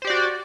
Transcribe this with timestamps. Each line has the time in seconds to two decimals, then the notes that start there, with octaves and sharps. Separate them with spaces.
0.02 C5
0.05 G4
0.07 D5
0.10 F#4